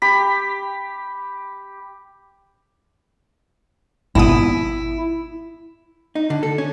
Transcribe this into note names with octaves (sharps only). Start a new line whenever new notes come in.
G4 B5
G#1 B2 E4 D#6
D#4
D3
A4
C#4